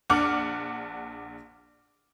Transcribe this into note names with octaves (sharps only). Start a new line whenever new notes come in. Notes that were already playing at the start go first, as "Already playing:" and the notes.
A#1 D4 F#5 D6 F6